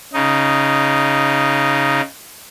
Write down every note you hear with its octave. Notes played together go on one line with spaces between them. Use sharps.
C#3 D#4